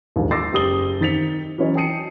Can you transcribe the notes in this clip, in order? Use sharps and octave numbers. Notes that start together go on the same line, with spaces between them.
A#1 D#2 G#2
C6 D6 E6 A6 A#6 C7
F#1 G4 D#6 G7
D#3 C4 A6 B6 C#7 F7
E3 F#3 C#4 C#5 D#5
G5 A5 D#6 C7 C#7 D#7